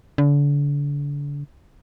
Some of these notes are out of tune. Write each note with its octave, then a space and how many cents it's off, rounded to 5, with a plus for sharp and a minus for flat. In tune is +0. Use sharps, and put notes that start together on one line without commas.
D3 -35